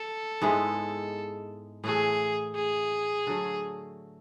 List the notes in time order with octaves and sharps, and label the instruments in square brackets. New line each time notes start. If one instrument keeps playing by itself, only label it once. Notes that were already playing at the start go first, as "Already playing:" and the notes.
Already playing: [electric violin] A4
[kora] G#2 G#3 B3 E4
[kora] A2 E3 A3 [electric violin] G#4
[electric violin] G#4
[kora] D3 F#3 A3